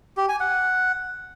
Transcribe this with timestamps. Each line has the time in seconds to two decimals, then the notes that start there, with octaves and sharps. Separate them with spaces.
0.17 G4
0.29 G#5
0.40 F#5